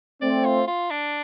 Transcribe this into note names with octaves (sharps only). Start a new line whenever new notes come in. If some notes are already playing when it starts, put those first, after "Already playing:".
A3 C4 D5
F4
F4
D4